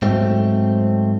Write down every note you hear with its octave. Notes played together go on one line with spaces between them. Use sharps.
G#2 F#3 A3 C4